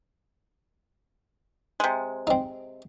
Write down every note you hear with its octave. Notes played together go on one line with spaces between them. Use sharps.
C3 G#3
C4 D#4